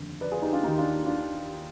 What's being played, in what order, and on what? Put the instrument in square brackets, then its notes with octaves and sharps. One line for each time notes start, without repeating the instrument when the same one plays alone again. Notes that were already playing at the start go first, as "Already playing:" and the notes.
Already playing: [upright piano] F1 D#2 D3
B4 D5
F4 G#4
D#4 G4
D4 F4
D#2 D#3 D#4 G4
D4 F4
D4 F4